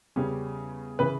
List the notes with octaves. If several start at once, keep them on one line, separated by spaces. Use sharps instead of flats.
E2 C#3 G3 C#4
C#3 E3 B4